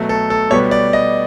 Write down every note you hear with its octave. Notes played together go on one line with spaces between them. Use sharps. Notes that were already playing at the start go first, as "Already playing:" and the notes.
Already playing: B2 F#3 A3
A4
A4
B2 G3 B3 C#5
D5
D#5